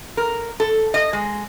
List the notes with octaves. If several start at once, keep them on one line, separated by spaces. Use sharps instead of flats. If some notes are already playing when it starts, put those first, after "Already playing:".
A#4
A4
D#5
G#3